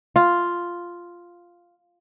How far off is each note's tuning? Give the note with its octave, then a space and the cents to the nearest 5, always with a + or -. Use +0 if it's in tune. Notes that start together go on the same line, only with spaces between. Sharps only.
F4 +0